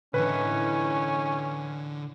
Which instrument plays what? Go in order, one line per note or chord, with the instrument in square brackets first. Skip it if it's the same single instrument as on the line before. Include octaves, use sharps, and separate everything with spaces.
[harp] A2 E3 [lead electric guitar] D3 D#4 [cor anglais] C#4 [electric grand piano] B4